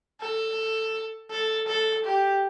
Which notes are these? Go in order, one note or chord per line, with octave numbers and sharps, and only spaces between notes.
A4
A4
A4
G4